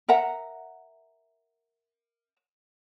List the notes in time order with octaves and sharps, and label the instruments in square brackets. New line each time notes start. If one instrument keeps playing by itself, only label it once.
[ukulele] A#4 E5 F#5 A#5